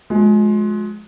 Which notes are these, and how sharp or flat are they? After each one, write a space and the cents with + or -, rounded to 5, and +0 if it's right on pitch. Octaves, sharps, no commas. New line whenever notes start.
F3 +45 G#3 +25